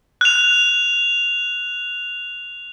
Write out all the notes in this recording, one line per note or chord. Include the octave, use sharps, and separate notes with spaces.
F#6 F7